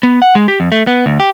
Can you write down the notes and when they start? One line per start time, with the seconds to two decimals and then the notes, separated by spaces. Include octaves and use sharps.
0.03 B3
0.22 F#5
0.35 G#3
0.48 G4
0.60 F2
0.72 A3
0.87 B3
1.06 D2
1.20 G4